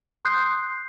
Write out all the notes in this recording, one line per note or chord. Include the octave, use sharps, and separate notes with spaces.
C6 D#6 F#6 G6 C7